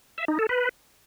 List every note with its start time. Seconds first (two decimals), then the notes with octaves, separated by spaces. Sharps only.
0.18 E5
0.28 D#4
0.39 A4
0.49 B4